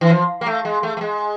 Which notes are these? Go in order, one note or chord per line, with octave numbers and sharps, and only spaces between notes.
E3
F3
A#3
A3
G#3
A3
A3
G#3